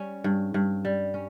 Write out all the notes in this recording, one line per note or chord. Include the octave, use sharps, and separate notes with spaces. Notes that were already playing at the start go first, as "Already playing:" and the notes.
Already playing: G3 C#4
G2
G2
G3
C#4